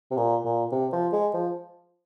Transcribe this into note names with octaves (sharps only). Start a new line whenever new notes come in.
C3
A#2
A#2
C3
F3
G#3
F3